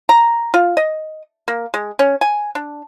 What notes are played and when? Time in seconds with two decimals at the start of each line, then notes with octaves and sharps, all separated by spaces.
0.09 A#5
0.54 F4
0.77 D#5
1.48 A#3
1.74 G#3
1.99 C#4
2.21 G#5
2.55 D4